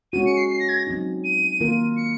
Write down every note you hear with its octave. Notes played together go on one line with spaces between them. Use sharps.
G#3 C#4 F#4 D#7
C#7
C7
C7
A#6
G#6
A#6
F#3 C4 D#4
D#7
D#3 A#3 F4 A#4
C#7